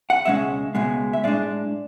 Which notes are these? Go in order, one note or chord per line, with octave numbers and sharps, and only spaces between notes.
F#5
C#2 B2 G#3 C#4 E5
C#2 B2 G#3
E5
A2 G#3 D4 D5